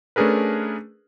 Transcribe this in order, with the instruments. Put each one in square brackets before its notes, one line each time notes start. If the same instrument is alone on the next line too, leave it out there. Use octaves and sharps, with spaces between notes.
[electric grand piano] A3 C#4 D4 G#4 A#4 B4